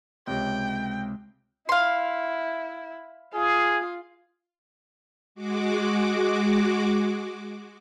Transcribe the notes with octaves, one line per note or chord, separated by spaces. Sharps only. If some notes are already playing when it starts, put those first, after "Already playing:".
C#2 C3 C#5 G5
E4 F5 C6
F4 G#4
G#3 F#4 D6